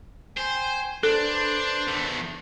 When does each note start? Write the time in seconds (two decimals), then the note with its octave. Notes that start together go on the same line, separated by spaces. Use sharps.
0.38 C5 G5 G#5
1.03 D4 A4 B4 C5
1.88 E2 A3